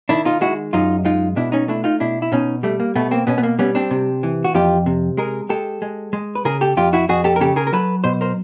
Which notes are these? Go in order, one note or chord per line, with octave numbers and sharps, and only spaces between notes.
D#3 D4 E4
D#4 F4
G#3 E4 F#4
F#2 D#4 F4
G#3 D#4 F4
B2 D4 E4
C#4 D#4
A3 D4 E4
D#4 F4
B2 D4 E4
E4
B2 C#4 D#4
G3 A3
A#3
B2 A3 B3
A#3 C4
B2 B3 C#4
B3
A#3
G3 B3 C#4
C4 D4
C3
E3
F#4
F2 F4 G4
C3
G#3 G#4 A#4
G#3 G4 A4
G#3
G#3
B4
C#3 G#4 A#4
G4 A4
F2 F4 G4
E4 F#4
F2 F#4 G#4
G4 A4
A#4
C#3 G4 A4
G#4 A#4
A#4
F#3 A4 B4
B2 C5
A#4 C5